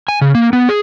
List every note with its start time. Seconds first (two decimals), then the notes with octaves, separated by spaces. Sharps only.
0.08 G#5
0.21 C#3
0.35 A#3
0.53 B3
0.69 G#4